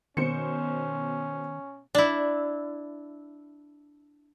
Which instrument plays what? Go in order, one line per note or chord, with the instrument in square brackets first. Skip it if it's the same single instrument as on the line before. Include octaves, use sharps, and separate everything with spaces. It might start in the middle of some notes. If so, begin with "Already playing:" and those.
[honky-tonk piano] B2 C5 C#7 [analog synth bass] D#3 [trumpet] C#4
[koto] D4 E4